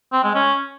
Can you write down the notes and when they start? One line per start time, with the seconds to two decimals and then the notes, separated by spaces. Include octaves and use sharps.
0.13 C4
0.24 G#3
0.35 C#4